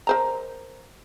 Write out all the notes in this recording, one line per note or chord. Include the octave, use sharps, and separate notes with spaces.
A#4 C5 A#5